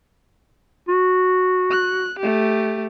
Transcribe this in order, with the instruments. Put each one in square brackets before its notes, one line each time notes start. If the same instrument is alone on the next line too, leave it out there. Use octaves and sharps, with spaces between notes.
[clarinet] F#4
[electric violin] F#6
A3 G4